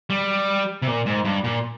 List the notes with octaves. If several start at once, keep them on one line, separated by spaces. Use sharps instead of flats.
G3
C3
A#2
G#2
G2
A#2